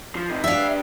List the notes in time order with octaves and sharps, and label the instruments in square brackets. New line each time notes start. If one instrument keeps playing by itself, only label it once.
[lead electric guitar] F3
C3 D#4
[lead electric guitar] D4 G4 [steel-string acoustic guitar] E5 F5